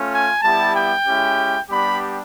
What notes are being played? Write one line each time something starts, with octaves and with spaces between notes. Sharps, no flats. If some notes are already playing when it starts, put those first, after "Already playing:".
Already playing: A3 C#4 F4
G#5
G3 B3 E4 G4 A5
G5
G#3 C#4 E4 G4
G3 B3 D4 G4 B5